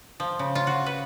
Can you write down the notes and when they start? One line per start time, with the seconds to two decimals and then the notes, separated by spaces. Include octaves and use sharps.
0.20 F3
0.39 C#3
0.55 F4
0.67 F#4
0.86 B4